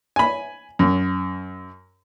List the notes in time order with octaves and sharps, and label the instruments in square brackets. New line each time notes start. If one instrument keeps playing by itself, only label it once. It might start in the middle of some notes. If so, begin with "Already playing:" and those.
[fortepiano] G#5 B5
F#2